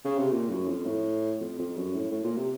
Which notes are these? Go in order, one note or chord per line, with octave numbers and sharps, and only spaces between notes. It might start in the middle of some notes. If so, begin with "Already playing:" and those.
C#3
C3
A#2
F#2
F2
A2
F2
F2
F#2
A2
A2
A#2
C3